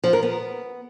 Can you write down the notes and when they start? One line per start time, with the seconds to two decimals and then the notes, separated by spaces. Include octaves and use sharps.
0.04 F3
0.13 A#4
0.23 B3